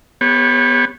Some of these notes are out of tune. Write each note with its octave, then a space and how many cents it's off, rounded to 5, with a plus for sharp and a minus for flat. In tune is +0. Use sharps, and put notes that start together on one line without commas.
B3 +0 G4 +40 C#5 -25